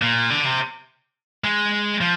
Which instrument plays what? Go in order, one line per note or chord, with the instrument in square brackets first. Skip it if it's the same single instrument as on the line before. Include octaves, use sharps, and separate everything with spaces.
[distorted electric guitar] A#2
D3
C3
G#3
F3